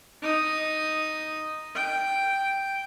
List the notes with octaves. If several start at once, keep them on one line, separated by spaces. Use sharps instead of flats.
D#4 D#6
G5